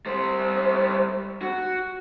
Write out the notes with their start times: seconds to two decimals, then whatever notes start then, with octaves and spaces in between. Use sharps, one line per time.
0.06 G3 C5
1.42 F#4